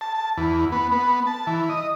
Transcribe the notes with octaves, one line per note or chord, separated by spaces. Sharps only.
A5
A5
E2
B3
B3
A5
E3
D#5